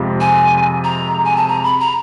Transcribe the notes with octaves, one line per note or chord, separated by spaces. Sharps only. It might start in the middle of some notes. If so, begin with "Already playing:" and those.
Already playing: F2 C3 F3 G#3
G#5
A#5
G#5
A5
A#5
B5
A#5